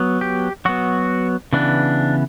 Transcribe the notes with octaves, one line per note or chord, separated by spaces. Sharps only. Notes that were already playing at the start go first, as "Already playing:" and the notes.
Already playing: F#3 B3
G4
F#3 B3 F#4
C#3 E3 B3 D4